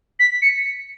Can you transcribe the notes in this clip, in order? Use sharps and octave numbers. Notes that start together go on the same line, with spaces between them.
B6
C#7